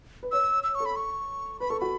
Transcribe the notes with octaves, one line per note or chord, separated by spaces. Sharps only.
B4
C#5 E6
E6
C#6
A4
B5
C#6
B4 B5
A4 C#6
F#4 B5